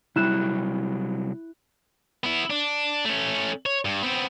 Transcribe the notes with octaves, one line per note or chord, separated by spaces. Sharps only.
C3 F#3 G3 E4 F#6 E7
B3 E4
D4
A3 C#4
C#5
G2
B3 C4